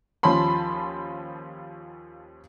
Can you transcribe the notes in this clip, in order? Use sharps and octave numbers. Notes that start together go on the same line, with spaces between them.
D#2 F3 C#4 A5 B5 C6